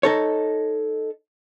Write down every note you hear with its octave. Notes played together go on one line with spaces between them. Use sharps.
D#4 A4 C#5